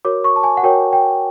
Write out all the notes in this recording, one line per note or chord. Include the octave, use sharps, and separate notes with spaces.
F#4 A#4 C#5 D6
C#6
A5
G#5
F#5
F#4 A#4 C#5 G5
G5